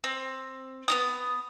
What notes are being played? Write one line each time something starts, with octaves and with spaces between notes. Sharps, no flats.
C4
B3 D#4 D#6